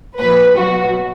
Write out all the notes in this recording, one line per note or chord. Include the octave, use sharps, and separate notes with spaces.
A#2 F3 B4
B2 F#3 F#4